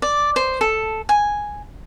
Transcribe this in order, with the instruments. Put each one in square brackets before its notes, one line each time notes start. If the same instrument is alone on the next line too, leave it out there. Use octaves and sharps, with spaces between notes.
[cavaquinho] D5
C5
A4
G#5